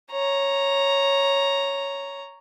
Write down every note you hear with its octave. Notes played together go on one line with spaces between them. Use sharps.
C#5 A#5